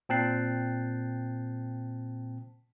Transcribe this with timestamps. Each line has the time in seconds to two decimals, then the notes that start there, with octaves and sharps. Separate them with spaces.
0.09 A#2 C4 G5 A5 F#6 C7